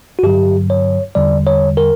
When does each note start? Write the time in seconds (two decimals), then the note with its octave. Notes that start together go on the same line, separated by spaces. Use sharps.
0.19 F#4
0.23 G2 D3 F#3 G4
0.70 C#5
1.15 E2 D3 G3 D5
1.47 C#5
1.77 A#4